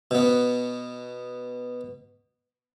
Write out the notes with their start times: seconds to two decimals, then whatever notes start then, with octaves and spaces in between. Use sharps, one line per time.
0.11 B2 B3